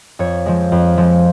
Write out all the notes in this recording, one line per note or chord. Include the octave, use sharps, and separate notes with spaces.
F2 C#5
F3 G#3
F2
F3 G#3